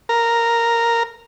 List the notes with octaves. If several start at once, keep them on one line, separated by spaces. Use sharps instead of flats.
A#4